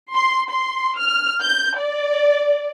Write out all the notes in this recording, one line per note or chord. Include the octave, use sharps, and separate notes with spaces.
C6
C6
F6
G6
D5